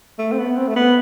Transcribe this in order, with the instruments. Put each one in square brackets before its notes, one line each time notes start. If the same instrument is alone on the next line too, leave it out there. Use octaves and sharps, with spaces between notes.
[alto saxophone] A3
C4
B3
C4
A3
B3